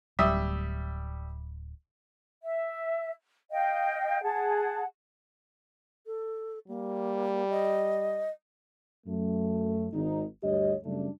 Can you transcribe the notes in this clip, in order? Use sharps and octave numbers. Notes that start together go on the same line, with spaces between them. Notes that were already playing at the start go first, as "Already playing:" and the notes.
D1 G3 E5 D#6
E5
D#5 F5 G5
G#4 F#5 A5
A4
G3 A#3
D#5
F#2 A3
G#1 D#4
D2 G2 G4 C#5 D#5
F#2 C#3 F#3 G3 A3 D4